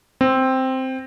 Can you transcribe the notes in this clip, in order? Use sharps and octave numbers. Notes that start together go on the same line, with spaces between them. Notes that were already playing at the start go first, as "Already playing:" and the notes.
C4